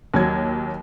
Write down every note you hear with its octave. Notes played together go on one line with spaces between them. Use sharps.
D#2 F#3 G#6